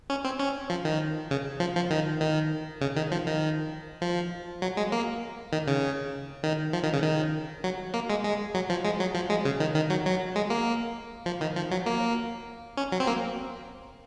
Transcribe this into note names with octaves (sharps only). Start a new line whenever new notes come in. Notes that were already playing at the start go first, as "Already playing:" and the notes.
C#4
C4
C#4
F3
D#3
C#3
F3
F3
D#3
D#3
C#3
D#3
F3
D#3
F3
F#3
G#3
A#3
D#3
C#3
D#3
F3
D#3
C#3
D#3
F#3
A#3
G#3
G#3
F#3
F3
G#3
F#3
F3
G#3
C#3
D#3
D#3
F#3
F#3
G#3
A#3
F3
D#3
F3
F#3
A#3
C#4
F#3
C4
A#3